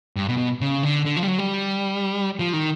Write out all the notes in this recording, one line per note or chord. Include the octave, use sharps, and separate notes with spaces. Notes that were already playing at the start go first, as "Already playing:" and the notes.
G2
B2
B2
C#3
D3
D3
F3
G3
F#3
G3
F3
D#3